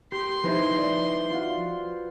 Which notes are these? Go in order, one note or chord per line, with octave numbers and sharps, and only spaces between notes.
G4 C6
F3 D#4 E4 B4 C5
D5
F4 F#4